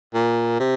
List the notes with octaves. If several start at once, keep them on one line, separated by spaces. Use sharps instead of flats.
A#2
C3